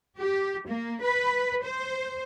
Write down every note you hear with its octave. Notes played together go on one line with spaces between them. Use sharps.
G4
A#3
B4
C5